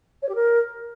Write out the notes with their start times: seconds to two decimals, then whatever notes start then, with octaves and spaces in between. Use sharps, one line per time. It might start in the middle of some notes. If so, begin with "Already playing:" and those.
0.22 C#5
0.28 G4
0.35 A#4